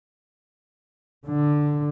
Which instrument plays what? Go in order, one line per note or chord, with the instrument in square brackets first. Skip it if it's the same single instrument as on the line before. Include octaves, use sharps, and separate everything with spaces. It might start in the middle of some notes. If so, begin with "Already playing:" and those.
[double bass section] D3